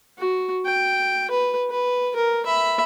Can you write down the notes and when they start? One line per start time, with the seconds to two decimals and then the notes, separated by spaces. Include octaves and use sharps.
0.19 F#4
0.65 G5
1.31 B4
1.70 B4
2.16 A#4
2.46 E5 B5